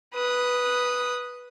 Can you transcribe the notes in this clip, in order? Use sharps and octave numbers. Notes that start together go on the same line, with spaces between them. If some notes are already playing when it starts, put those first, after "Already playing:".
B4 D#6